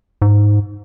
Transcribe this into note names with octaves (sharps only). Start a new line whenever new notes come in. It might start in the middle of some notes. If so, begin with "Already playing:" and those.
G#2